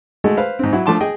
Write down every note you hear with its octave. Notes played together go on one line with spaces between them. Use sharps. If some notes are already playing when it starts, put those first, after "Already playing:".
G#3 A3 F#4 G#4 A4
B4 C5 F5
G#2 C4
F#3 E4
F3 A3 D4 A5 C6 D6
G#4 D#5 G5